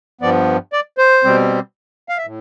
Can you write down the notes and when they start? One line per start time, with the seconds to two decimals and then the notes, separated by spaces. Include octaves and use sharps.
0.21 G2 F3 B3 D5
0.73 D5
0.98 C5
1.24 B2 G3 C4
2.09 F5
2.17 E5
2.25 A2